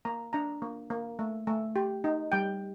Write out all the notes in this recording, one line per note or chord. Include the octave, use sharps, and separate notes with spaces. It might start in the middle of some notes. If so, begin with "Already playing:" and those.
A#3 A#5
D4 A#5
A#3
A#3
A3
A3
G4
D#4
G3 G5